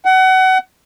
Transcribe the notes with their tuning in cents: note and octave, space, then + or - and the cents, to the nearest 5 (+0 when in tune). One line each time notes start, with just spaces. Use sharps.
F#5 +25